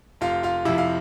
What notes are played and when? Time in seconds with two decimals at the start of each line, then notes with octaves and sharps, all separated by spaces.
0.21 F1 F4 F5
0.43 F4 F5
0.65 F2 C3 E4 E5
0.78 F5